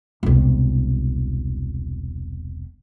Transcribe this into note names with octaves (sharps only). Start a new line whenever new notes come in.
E1 C2